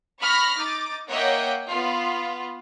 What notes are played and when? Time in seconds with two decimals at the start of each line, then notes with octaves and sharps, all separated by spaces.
0.20 B5 C#6 F6 A#6 B6
0.57 D#4 D6 A6
1.09 A#3 C#5 D#5 E5 F#5 G5
1.67 B3 F4